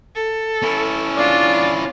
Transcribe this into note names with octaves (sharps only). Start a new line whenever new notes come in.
A4
C#4 E4
E2 D4 F4 D5